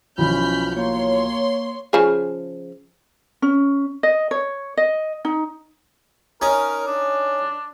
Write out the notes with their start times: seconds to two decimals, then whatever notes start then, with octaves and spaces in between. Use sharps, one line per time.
0.18 B1 E3 F3 C#4 B5 F6 G6
0.74 A#3 C#5 C6
1.93 C#3 F3 G#4
3.42 C#4
4.03 D#5
4.31 C#5
4.77 D#5
5.25 D#4
6.42 C#4 D#4 A#4
6.87 D4